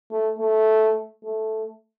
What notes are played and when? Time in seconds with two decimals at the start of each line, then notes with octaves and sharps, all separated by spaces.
0.11 A3
0.39 A3
1.24 A3